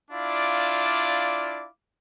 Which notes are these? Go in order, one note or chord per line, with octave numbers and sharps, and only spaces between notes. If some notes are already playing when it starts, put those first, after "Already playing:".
D4 E4 F4 D5 F5 D6